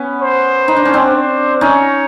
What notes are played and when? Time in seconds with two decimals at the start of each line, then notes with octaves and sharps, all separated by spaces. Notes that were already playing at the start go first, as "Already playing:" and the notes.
Already playing: B3 C#4
0.21 C5
0.68 D#4
0.77 D4
0.85 C#4
0.94 C4 D4
1.15 C5
1.61 C#4 D#4 C#5